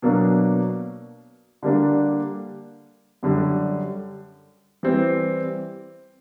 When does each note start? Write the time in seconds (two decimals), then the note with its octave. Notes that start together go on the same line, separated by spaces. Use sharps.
0.02 B2 F#3 A#3 D4
1.63 D3 G3 A#3 D4
3.23 F#2 D3 G3
4.83 E3 G3 C4